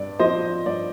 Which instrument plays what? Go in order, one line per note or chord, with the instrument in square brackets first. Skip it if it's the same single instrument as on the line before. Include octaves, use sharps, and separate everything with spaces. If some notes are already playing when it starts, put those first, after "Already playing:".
Already playing: [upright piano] G2 D5
F3 C4 C5 D#5
G2 D5